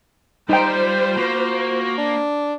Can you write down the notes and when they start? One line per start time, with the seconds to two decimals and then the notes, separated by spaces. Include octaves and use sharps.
0.49 G3 D#4 F4 C5 G5
1.17 A#3 F#4
1.98 D4